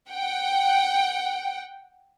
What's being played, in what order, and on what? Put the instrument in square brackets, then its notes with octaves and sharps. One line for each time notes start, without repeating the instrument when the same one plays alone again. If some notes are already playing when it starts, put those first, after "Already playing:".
[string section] F#5 G5